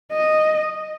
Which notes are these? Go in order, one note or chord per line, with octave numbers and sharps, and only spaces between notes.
D#5